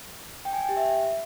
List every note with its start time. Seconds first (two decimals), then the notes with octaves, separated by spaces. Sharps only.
0.45 G5
0.53 G#5
0.61 G5
0.69 G4
0.77 E5